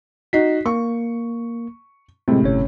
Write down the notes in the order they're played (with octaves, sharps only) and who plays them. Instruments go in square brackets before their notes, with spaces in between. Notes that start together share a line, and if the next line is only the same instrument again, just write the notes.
[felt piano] D#4 F#4 [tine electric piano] B6 C7
[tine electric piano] A#3 [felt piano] C#6
[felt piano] A2 C3 [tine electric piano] G#3 C4
[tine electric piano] G1 C#4 C#5